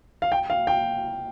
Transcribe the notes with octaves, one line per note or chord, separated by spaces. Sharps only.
F5
G5
F5
G5